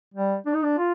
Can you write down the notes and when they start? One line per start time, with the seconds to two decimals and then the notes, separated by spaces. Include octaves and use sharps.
0.14 G3
0.46 D4
0.54 D#4
0.63 D4
0.78 F4